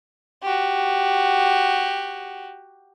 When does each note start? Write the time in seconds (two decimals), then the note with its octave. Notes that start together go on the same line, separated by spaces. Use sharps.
0.43 F#4 G4